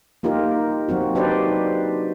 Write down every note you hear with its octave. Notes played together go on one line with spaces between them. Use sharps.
A#3 D#4 F4 G4 A#4
F#3 C4 F#4
D4 D#4 G4 B4 C5 D5